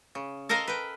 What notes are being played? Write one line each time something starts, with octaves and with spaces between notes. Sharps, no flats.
C#3
A4 A#4 C5 D#5 F5 A#5
B4 G5